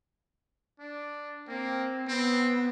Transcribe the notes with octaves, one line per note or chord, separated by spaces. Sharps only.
D4
A#3 C4
B3 C4